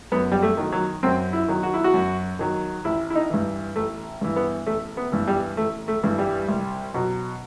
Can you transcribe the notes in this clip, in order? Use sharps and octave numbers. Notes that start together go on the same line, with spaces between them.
F#2 B3
G3
A3
D#3 F#3
F#3
F#2 C4
E4
D#3 F#3
F#4
E4
F#4
F#2
D#3 F#3
A1 E4
E4
D#4
G2 E3
A1 A3
G2 E3
B3
A1 A3
B3
G2 E3
G3
A1 A3
A3
G2 E3
G3
C2
B2 F#3